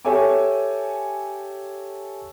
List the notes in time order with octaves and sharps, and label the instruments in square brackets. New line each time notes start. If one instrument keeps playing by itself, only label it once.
[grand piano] G4 A4 C#5 E5 G#5 D6